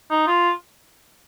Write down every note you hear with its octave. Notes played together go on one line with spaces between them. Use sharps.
D#4
F4